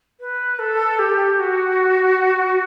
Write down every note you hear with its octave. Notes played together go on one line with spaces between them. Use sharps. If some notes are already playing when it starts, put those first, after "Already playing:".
B4
A4
G4
F#4